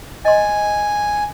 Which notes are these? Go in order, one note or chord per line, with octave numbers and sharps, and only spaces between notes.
D#5 G#5 C6